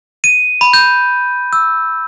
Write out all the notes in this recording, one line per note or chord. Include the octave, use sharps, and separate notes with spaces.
D#7
B5
G6
E6